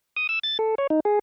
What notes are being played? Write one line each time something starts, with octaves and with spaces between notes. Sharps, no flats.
D#6
E6
A6
A4
C#5
D#4
G#4